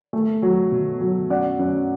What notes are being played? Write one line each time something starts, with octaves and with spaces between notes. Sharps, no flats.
A3
F#3
B2
F#3
F#2 D5 F#5
F#2